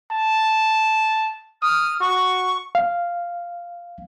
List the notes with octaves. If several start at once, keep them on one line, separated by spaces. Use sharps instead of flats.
A5
D#6 F6
F#4 C#6
F5